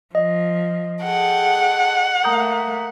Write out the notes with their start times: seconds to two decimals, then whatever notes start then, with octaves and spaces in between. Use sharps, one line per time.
0.15 F3 D#5
1.03 G#4 A4 F#5 G5
2.24 A3 A#3 A#5 D#6 G6